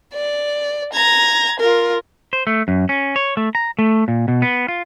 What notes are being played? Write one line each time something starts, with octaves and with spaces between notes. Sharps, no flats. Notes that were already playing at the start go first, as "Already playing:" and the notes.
D5
A#5 G#6
F4 A#4
C5
A3
F#2
C#4
C#5
A3
A#5
A3
A#2
B2
B3
F4